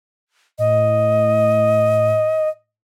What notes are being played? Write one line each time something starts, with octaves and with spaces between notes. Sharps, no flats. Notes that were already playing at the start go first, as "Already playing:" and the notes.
A2 D#5